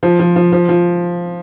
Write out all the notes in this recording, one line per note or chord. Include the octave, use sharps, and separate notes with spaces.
F3
F3
F3
F3
F3